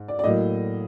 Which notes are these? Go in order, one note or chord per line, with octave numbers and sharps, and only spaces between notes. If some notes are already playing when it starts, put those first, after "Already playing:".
Already playing: G#2
D5
D5
A2 F#3 A#3 D#5